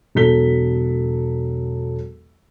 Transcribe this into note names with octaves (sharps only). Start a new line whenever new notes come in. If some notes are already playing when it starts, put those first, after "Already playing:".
E1 F#3 A4 B6 G7